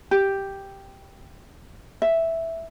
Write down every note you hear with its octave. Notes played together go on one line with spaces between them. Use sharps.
G4
E5